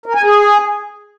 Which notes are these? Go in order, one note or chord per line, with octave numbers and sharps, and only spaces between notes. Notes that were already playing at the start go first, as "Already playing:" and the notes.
A#4
G#5
G#4